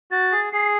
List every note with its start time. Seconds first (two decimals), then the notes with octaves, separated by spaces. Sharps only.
0.11 F#4 A6
0.32 G#4
0.53 G#4 C7